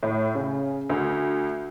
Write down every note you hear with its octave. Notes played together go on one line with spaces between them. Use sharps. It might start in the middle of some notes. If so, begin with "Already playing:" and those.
A2
C#3
D2